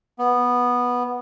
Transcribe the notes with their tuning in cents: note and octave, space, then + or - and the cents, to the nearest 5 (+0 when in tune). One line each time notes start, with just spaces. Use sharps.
B3 -10